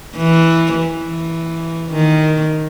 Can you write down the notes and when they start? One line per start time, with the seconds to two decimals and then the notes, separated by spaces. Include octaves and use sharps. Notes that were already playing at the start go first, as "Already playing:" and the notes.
0.16 E3
0.74 E3
1.90 D#3